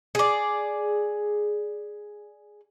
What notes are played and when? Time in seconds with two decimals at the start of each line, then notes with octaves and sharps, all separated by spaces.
0.15 G#4 D5